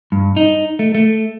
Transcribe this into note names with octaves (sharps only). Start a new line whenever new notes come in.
G2
D#4
A3
A3